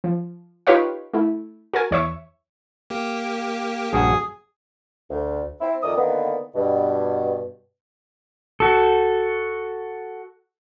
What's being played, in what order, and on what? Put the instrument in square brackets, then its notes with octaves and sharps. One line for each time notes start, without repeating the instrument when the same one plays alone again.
[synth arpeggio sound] F3
D#4 F4 G4 B4 C#5 F5
A3 E4
F#4 A#4 G#5
E2 C#5 E5 C#6
[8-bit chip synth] A#3 G4
[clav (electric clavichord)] A#1 G2 F#4 [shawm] G#4
[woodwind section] D2
C4 E4
F2 D#3 D5 E5 D#6
D3 D#3 A#3 B3
G2 B2
[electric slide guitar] F#4 A4